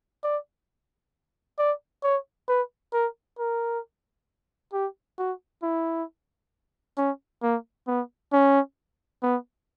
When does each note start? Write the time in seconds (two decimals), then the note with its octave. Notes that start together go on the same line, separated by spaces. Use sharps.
0.23 D5
1.58 D5
2.03 C#5
2.48 B4
2.93 A#4
3.39 A#4
4.73 G4
5.18 F#4
5.63 E4
6.97 C#4
7.42 A#3
7.87 B3
8.33 C#4
9.22 B3